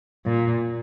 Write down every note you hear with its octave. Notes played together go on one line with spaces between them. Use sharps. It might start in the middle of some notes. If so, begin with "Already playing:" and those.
A#2